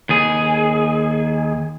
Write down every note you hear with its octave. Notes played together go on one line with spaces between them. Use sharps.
D#2 G#4